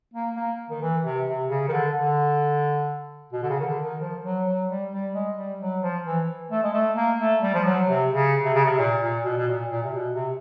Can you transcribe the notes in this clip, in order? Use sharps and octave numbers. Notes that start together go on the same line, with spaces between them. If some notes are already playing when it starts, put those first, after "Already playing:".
A#3
A#3
D#3
E3
C3
C3
C#3
D#3
D3
D3
B2
D3
C#3
D#3
D3
D#3
F3
F#3
F#3
G3
G3
G#3
G3
F#3
F3
E3
A3
G#3
A3
A#3
A3
G3
F3
F#3
C3
C#3
C3
C#3
C3
A#2
A#2
B2
B2
A#2
A#2
C3
B2
C3